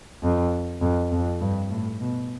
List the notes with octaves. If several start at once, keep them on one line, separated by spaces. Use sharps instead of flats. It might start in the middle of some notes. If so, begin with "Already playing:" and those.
F2
F2
F2
G2
A2
B2